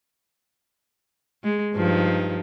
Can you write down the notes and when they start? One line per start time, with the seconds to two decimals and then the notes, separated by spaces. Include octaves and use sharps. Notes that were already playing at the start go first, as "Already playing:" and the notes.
1.44 G#3
1.74 G2 F3 D#4